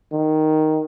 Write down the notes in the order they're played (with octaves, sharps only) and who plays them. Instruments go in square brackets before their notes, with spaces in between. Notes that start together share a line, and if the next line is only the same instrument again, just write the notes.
[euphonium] D#3